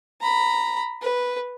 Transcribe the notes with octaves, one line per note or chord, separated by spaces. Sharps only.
A#5 B5
B4